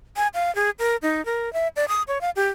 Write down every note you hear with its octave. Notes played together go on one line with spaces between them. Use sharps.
G#5
F5
G#4
A#4
D#4
A#4
E5
D5
D#6
C#5
F5
G4